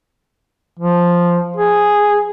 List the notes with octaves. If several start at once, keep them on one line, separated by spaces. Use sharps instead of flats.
F3
G#4